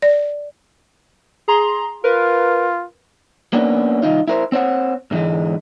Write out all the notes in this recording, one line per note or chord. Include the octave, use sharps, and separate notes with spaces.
D5
G#4 A#5 C6
F4 A#4 B4
A#3 B3 C#4 D4
C2 D#3 D#4 F4
E4 A#4 C5
C4 C5 C#5 F#5
G#2 D3 E3 G#3